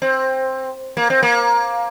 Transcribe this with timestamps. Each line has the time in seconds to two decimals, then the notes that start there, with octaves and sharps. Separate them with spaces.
0.02 C4
0.97 A#3
1.10 C4
1.23 A#3